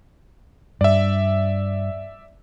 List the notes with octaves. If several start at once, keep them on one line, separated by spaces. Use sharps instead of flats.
G2 D5 E5